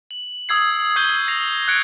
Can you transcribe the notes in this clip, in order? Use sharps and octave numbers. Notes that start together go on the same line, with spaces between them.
F#7
D#6 E6 G#6 C7
C#6 D#6 G6 C7 D#7 G7
A#6 C7 F7
F#6 G#6 C#7 D7